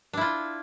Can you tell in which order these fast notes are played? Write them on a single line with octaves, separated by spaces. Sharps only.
D4 E4 F4